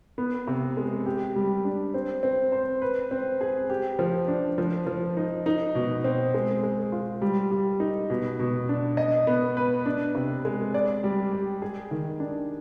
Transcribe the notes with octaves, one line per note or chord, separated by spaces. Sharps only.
B3
C3
G#3
G4
G3
D4
C4
C4
C5
B4
C4
G#4
G4
F3
D4
F3
F3
D#4
D#4
B2
C4
G#3
G#3
F4
G3
G3
D#4
B2
B2
D4
D#5
B3
B4
D4
C3
G#3
D5
G3
G4
G#4
D#3
D4